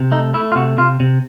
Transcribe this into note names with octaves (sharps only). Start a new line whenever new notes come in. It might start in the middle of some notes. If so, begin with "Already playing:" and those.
Already playing: C3
A3 D#4
A3 E4
F4
C3 F#4
C3 F4
C3